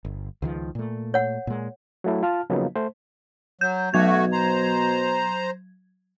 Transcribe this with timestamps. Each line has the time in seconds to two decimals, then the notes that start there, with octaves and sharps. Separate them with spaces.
0.05 G1
0.42 C#2 D#3 F3
0.75 A#2 A3
1.14 C#5 F#5
1.47 A#2 G#3
2.04 F#3 A3 E4
2.23 F4 A5 F6
2.50 C#3 F3 F#3 A#3 B3 D#4
2.76 A3 C5
3.61 F#3 G6
3.94 B2 F#3 A3 F#4 G#6
4.32 C5 A#5